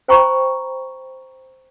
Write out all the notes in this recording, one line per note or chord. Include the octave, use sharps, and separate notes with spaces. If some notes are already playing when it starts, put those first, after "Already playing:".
C5 G5 A#5 B5 C#6